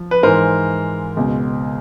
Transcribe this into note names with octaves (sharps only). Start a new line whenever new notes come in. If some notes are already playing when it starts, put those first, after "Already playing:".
Already playing: F3
B4
G#2 E3 A#4 C5
C#2 B2